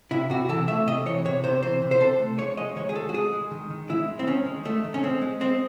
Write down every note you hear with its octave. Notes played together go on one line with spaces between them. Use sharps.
C3 E4
C3 F#4
E3 A4
A3 E5
C3 D#5
E3 C#5
C3 C#5
C3 C5
E3 C5
C3
C5
C3 A4
A3
G#3 C#5
G#3 D#5
D#3 C#5
G#4
G#3 A4
F#4
G#3 G#4
G#3
D#3
D#3
G#3 E4
G#3
C4
D#3 C#4
G#3
D#3 A3
D#3
C#4
G#3 C4
G#3
G#3 C4